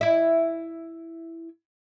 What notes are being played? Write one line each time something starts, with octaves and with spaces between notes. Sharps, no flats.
E4 E5